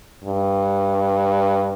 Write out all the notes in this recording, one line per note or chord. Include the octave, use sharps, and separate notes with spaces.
G2